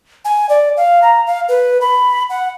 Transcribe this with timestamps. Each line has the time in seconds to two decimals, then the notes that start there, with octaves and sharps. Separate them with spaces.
0.25 G#5
0.49 D5
0.77 F5
1.02 A#5
1.27 F5
1.49 B4
1.81 B5
2.30 F#5